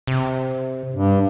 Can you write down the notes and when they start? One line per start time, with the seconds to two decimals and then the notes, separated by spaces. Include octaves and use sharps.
0.07 C3
0.94 G2